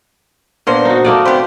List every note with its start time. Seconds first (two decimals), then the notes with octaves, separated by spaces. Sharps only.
0.67 A#2 A#3 B3 D4 C5
0.85 D#4 F#4
1.05 A3 A#3 D5 D6 D#6
1.25 B3 C4 C5 G5 B5